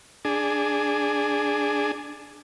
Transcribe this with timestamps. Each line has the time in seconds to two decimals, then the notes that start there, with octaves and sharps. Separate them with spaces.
0.25 D4 G#4